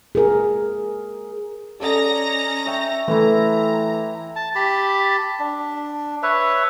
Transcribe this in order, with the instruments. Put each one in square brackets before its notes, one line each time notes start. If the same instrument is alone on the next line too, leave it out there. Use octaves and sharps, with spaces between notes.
[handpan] G#4 A#4
[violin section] C#4 A#5 A#6 [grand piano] A4 [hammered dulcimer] D5 D#5
[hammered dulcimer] C#5 E5 G5
[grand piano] E3 A3 [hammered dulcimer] E4 C5 [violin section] A#5
[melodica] A5
G4 A5 B5
D4
B4 C#5 E5